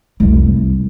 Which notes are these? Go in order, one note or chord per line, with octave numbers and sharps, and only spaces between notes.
C2 F2